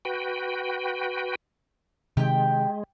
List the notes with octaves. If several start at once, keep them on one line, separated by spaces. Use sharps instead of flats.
F#4 B4 G5
C3 D#3 G#3 G4 G5